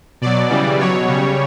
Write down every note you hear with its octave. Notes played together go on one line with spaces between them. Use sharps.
B2 F#3 D5
C#3 E3 G3
B2 F#3 C#5
C#3 G3